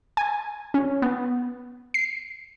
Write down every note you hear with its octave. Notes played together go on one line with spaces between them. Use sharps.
G#5
C#4
B3
C7